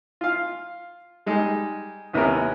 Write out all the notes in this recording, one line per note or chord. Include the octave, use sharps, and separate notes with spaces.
F4 F5
G3 G#3 D#4 G#4
D#2 C3 B3 C#4 E4 A#4